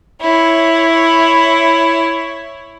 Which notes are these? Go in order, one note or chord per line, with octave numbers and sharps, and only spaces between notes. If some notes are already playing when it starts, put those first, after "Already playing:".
E4 C#5